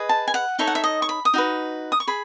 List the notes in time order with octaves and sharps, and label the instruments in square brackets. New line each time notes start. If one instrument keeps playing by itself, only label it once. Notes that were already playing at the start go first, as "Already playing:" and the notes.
Already playing: [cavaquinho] G#4 B4 D#5
A5
G#5
F#5
D#4 A4 C#5 E5
F#5
E5
D#5
C#6
B5
D#6
D#4 F#4 B4
D#6
C#6
G#4 B5